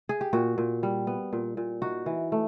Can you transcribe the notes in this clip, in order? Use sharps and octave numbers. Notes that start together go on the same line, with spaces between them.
G#4
G4
A#2 F#4
A#2
G3
B3
A#2
A#2
D#4 F#4
E3
A3